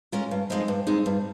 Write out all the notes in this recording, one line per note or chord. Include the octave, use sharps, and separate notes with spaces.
G#3 C#4 F4 A#4
G2
F3 G#3 C4 D#4
G2
F3 G#3 C4 D#4
G2